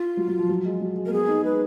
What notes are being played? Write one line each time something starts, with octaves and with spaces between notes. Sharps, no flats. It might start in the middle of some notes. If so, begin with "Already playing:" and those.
Already playing: F4
F#3
F#3
F3
F#3
G#3
F#3
G#3
A#3 A#4
B3 G#4
D#4
G#3 B4